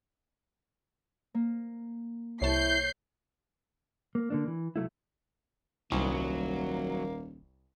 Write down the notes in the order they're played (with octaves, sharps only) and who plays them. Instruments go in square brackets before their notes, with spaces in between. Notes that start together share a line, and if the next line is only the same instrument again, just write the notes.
[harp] A#3
[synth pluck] C2 A5 [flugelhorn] E4 [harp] C#5 [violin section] G6 C7
[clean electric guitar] A#3
D3 A#3 D4
E3
C2 F#3 A3 E4
[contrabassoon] D#1 [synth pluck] C2 [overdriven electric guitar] F#3 [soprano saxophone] A#3